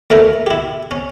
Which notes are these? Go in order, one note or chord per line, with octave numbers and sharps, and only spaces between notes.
D2 A3 E4 A#4
E4 G4
C#4